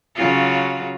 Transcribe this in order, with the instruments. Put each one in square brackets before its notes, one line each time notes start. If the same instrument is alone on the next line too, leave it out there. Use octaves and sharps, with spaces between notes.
[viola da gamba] C#3 F#3 F4